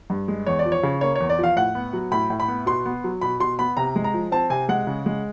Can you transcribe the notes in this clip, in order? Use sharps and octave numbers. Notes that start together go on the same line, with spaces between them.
G2
G#3
E2 C#5
D5
F3
C#5
C#3
A#3 C#5
C#5
E2
D5
F3 F5
A2 F#5
B3
F#3
A2 B5
A2
B5
B3
B2 C6
B3
F#3
B2 B5
B2 C6
B3 B5
C3 A#5
G#3
A#5
F3
C4 A5
C3 G#5
G#3 F#5
C#3
G#3